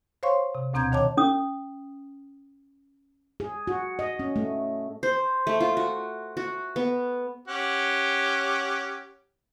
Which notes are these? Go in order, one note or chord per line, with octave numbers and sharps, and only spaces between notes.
C5 C#5 F5 C6 C#6
C3
D2 B2 C4 A#5 G6 G#6
D#2 D#3 C#5 A5 D6
C#4 D#6
G#4
F#4
D#5
C#4
A3
C5
A3
F4
F#4
F#4
B3
C#4 G4 F#5